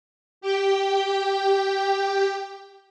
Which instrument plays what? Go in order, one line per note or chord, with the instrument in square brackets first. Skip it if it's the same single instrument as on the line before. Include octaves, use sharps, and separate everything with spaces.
[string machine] G4 G5